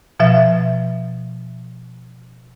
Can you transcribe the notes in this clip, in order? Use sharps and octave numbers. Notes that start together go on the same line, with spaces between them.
B2 F3 E5 A6